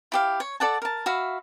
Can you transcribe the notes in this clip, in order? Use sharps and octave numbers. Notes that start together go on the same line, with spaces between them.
E4 G4 F5
C#5
A4 D5 F#5 A5
A#4 A5
F#4 E5 F5 B5